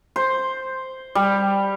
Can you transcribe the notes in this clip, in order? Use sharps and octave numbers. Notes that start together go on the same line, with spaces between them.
C5
G3